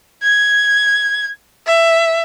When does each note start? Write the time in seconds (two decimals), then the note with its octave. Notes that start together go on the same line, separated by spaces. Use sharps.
0.23 G#6
1.66 E5